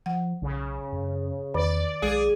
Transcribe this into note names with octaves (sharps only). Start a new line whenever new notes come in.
F3 F#5
B1 C#3
F#2
E2 D#3 D5
B1 G#3 G#4